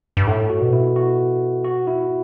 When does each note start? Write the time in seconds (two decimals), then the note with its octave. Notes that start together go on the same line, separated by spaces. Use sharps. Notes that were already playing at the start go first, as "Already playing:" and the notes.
0.17 G2
0.27 A2 A4
0.50 F#4
0.61 B2
0.73 E4
0.96 F#4
1.64 F#4
1.87 E4